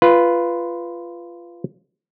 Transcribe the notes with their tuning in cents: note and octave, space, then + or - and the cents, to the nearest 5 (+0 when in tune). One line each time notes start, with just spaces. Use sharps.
F4 -15 B4 +0